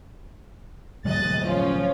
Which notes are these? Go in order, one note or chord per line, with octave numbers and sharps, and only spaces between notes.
D3 F#3 G#3 D#5 F#6 A6
F3 C#4 F4